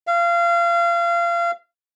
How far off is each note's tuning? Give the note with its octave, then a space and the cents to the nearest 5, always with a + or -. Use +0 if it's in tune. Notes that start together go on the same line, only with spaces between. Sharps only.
F5 -30